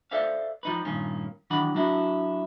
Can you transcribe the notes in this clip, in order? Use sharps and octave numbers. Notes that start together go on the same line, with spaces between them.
A4 C5 D5 E5 F5
F3 D#4 B4
G2 A#2 D#3 A#3 C#4
D#3 E3 F#3 D4 F#5 B5
F#3 D4 E4 F#4